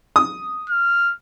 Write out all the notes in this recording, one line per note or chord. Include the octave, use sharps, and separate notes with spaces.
D#6
F6